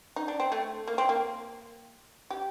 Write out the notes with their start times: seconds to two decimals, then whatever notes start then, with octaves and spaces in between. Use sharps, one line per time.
0.16 D#4
0.28 D4
0.40 C4
0.52 A3
0.87 A#3
0.98 C4
1.09 A#3
2.30 G4